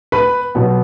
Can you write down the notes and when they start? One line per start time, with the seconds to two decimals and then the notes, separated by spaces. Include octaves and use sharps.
0.12 B4 B5
0.55 B2 F#3 B3